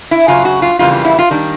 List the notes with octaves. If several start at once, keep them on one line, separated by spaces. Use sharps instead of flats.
E4
F#2 C#3 F#3 F4
F#4
F4
F2 C#3 E3 G3 A#3 F4
F4
E4
F4
D#3 G3 A#3 D4